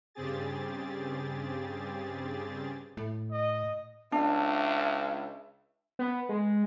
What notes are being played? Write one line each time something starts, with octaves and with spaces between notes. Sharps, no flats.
G2 C#3 C4 G4 G#4 A6
A2
D#5
C#2 D4 E5
B3
G#3